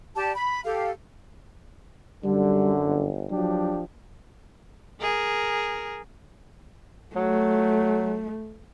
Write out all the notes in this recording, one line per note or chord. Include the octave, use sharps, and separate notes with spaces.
G4 D5 A5
B5
G4 A4 F5
F#2 D3 G3
G1
F3 F#3 D4 G4
G#4 A#4
F#3 A3